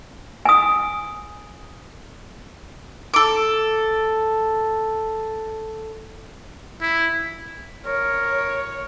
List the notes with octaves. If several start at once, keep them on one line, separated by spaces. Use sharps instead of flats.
G#5 D#6
A4 D6
E4
A#4 C#5